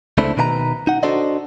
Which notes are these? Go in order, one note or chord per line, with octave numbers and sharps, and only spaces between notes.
C#2 A3 C4 D4 E4
B2 D#3 B4 F5 A#5
D#4 F#5
D4 F#4 A4 C5 D5 D#5